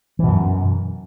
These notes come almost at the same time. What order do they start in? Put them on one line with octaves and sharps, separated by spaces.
E3 B2 F#2